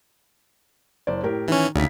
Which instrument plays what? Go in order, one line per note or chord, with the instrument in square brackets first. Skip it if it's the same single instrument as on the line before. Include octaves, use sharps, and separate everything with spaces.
[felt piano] F#1 C5 D5
A2 G4 A#4
[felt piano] D#3 [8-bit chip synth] E3 C#4
[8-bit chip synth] D2 [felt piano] C#3 D#4 B6